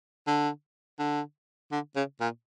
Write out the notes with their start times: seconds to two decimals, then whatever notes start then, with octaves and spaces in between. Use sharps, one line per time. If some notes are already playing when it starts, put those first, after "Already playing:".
0.27 D3
0.99 D3
1.72 D3
1.96 C#3
2.21 A#2